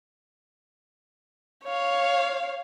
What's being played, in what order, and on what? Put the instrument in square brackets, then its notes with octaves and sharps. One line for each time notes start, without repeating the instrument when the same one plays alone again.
[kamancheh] C#5 F5